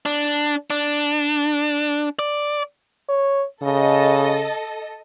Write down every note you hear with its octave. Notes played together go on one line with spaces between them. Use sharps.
D4
D4
D5
C#5
C#3 A4 D#5